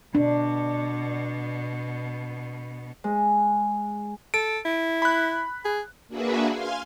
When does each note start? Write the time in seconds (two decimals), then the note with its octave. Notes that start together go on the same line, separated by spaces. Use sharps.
0.15 B2 B3 D4
3.04 G#3
4.34 A4 D7
4.65 E4
5.02 B5 F#6
5.65 G#4
6.08 A#3 D4 F#4 G#4 B4 E5
6.51 F5 G#5 C6 F6